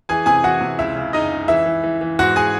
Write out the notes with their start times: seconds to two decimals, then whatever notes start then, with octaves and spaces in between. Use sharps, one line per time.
0.09 E3 G#4 G#5
0.26 C3 G#4 G#5
0.44 E3 F#4 F#5
0.61 C3
0.79 C#2 E4 E5
0.96 C#3
1.13 C#3 D#4 D#5
1.32 C#2
1.48 E3 E4 E5
1.66 E3
1.83 E3
2.01 E3
2.19 G#2 F#4 F#5
2.36 G#4 G#5